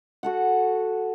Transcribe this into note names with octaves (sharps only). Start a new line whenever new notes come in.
F#4 A4 F#5